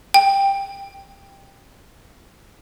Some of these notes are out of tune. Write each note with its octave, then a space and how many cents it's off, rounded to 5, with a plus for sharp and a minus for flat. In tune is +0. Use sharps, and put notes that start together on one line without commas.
G5 +10